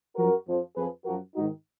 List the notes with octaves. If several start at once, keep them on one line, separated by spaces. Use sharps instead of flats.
F#2 F3 F#4 A#4
F2 F3
F2 F3 G#4 B4
F#2 F3 F#4 A#4
G#2 D#3 D#4 F#4